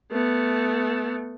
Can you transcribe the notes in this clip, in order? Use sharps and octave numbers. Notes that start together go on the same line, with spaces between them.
A3 B3